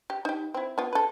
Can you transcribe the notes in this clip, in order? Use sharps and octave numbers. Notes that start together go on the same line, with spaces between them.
G4
D#4 G4
C4 E4
B3 F4
A4 B4